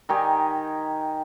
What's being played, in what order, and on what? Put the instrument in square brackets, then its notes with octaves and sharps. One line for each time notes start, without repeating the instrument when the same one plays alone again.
[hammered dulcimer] D#3 D#4 G4 G#5